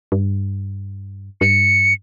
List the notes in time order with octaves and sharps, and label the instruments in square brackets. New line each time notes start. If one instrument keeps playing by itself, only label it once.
[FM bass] G2
[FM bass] G2 [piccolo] C#7